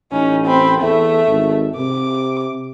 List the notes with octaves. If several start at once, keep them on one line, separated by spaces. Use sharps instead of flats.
A1 C#4 D#4
C4 B5
E2 A3 E5
G#1
C3 D6